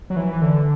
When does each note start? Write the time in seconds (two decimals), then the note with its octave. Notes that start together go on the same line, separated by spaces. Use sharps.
0.10 F#3
0.16 E3
0.32 E3
0.42 D3